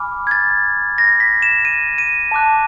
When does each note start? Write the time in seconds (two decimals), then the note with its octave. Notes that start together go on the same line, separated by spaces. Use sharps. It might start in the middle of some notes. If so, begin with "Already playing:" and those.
Already playing: G#5 B5 D6 F6
0.27 G#6
0.31 A6
0.98 A#6
1.20 B6
1.42 E7
1.65 D#7
1.98 D#7
2.31 A5 D6 F#6